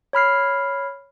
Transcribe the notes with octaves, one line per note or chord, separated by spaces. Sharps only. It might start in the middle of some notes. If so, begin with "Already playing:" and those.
C#5 B5 F6 C7